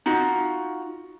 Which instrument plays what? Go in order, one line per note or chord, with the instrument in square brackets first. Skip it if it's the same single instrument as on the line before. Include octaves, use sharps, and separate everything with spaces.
[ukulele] D#4 F4 F#4